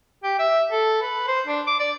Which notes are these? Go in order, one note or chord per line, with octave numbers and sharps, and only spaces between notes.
G4
E5
A4
B4
C5
D4
D6
D5